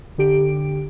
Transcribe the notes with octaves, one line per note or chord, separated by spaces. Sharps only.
D3 G4 D7